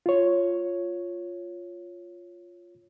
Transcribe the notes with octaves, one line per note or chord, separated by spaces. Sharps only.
F4 C#5